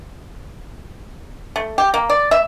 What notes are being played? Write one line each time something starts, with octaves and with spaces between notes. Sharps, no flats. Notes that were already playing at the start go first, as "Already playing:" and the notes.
A3
G4
A#3
D5
E5